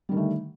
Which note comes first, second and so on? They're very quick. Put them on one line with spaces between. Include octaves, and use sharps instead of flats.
G3 D#3 D3 A3